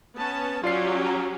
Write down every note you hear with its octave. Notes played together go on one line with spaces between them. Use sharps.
B3 C#4 A5
F#3 C#4 F4 G4 D5 C7
A#5